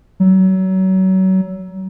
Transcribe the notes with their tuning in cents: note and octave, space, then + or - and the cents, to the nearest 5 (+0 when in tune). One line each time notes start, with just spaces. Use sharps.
F#3 +30